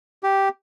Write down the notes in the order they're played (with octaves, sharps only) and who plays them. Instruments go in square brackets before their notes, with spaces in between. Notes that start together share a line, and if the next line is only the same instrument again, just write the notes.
[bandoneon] G4